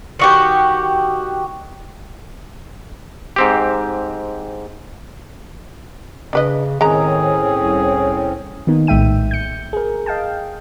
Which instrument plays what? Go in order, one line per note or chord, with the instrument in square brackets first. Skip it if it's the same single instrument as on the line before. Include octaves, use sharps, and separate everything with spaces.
[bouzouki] D#3 F#4 G4
[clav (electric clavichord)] G#2 C4 G4
[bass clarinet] C#3 [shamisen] D4 B4 D#5
[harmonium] A2 C4 C#4 [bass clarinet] D#3 [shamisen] G#3 A#5 [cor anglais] G#4
[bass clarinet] C2
[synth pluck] D#3 A#3 B3 D#4
A#1 A2 G#3 E5 G5 D#7
G6 C#7
G#4 A#4
D#5 F5 G5 A5